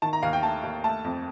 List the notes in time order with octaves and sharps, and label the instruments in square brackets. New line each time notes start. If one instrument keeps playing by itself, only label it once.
[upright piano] D#3 A5
A#5
D#2 F5
G5
A3 A5
D#2
A3 A5
F2